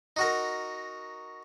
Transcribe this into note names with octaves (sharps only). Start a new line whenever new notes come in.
D#4 F#4 A#4